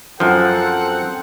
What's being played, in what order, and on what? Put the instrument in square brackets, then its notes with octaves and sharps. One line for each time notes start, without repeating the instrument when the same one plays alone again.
[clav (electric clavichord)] F#2 F3 [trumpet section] C4 F#5 [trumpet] A4